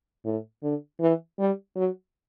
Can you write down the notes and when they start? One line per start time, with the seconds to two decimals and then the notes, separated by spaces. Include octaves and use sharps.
0.25 A2
0.63 D3
1.00 E3
1.39 G3
1.76 F#3